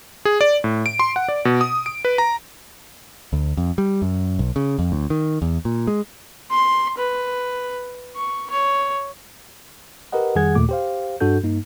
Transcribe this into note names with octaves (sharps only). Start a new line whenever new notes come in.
G#4
D5
A2
D7
C6
F#5
D5
B2
D#6
D7
B4
A#5
D2
F2
G3
F#2
B1
C#3
F2
D2
D#3
E2
A#2
G#3
C6
B4
C#6
C#5
G4 A#4 B4 D#5 F#5
F2 D#3 G3 G#4 F#5 G#6
D#2 A#2 A3 D6
G4 C5 F5
G2 D4 F#4 A4 G6
G2 A#3 D#4